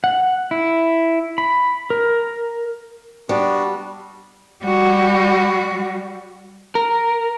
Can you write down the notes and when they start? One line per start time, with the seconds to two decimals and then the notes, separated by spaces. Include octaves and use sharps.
0.04 F#5
0.51 E4
1.38 B5
1.90 A#4
3.29 G3 B3 D4 F#4
4.63 G3 F#4
6.75 A#4